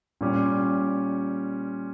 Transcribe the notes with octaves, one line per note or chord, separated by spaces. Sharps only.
A#2 G3 C#4 G4